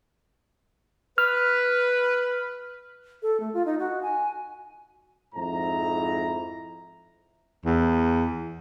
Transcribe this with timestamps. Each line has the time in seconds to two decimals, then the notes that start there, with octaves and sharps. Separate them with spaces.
1.18 B4 F6
3.23 A4
3.40 A3
3.54 F4
3.66 D#4
3.79 F#4
4.03 G#5
5.35 F2 G#2 E4 A#5
7.65 E2